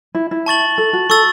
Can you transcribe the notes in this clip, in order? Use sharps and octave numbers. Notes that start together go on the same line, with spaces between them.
E4
E4
A5 C#6 A6 F#7
A4
F#4
A4 C#6 E6 A6